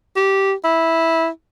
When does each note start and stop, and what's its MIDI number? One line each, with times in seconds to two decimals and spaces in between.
0.16 0.53 67
0.64 1.28 64